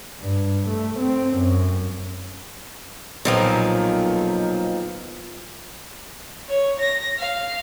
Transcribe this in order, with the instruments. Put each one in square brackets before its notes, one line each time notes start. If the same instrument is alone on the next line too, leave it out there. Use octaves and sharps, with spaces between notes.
[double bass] G2
A3
C4
F#2
[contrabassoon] B1 [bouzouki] A#2 D#3 F3
[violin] C#5
A#6
F5